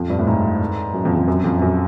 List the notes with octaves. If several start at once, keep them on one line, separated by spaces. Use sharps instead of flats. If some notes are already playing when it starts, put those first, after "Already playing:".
Already playing: F2
G2
A2
G#2
F#2
F2
F2
F#2
F2
F#2